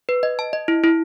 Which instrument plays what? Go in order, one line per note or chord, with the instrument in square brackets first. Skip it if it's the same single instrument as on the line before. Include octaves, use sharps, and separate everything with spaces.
[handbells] B4
D#5
A5
D#5
E4
E4